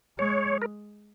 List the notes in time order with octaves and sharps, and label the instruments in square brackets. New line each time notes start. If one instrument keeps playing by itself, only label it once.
[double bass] G#3 [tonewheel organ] C#5
[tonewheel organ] A#4